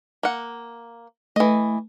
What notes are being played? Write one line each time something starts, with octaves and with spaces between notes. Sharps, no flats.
A#3 F#5
E3 A3 D#5